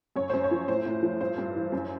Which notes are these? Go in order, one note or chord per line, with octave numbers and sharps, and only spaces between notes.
F#2 C#5
F#2 C5
C#5
F3
A2 C5
A2
F3
G2 C5
G2
E3
F#2